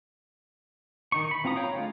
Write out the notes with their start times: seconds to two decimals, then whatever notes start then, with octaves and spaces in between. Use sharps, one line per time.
1.12 D#3 D#4 C#6
1.31 B5
1.44 E3 C4 F4 A#5 D#6
1.56 C#5 F5 G5 A#5
1.75 D3 G#3 A3 F4